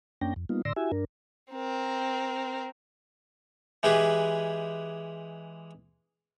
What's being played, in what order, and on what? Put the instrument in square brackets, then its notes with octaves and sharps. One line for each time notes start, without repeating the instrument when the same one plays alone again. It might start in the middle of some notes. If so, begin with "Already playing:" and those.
[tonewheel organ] F#2 A#3 C#4 D4 G5 A#6
F2
G3 A#3 B3 D#4 F4
A2 D3 D5 C6 E6 A#6
E4 F#4 G4 E5 G#5
G2 D4 A#4
[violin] C4 A#4
[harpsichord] E3 G#3 G4 G#4 B4